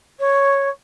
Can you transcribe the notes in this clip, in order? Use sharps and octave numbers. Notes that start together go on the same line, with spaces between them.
C#5